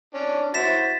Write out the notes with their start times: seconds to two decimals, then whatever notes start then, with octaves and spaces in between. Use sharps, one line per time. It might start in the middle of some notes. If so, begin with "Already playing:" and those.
0.14 C#4 D4
0.54 E4 F#4 C5 A6 B6 E7